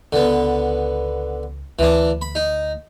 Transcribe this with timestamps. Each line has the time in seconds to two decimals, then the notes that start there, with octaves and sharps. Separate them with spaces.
0.12 C#2 D3 B3
1.79 D2 E3 D4
2.22 B5
2.35 D#4